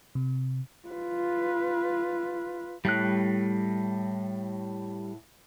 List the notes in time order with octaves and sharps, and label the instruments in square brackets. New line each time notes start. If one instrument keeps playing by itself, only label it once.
[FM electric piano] C3
[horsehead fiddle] F4 B4
[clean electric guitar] A2 [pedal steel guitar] G3 F#6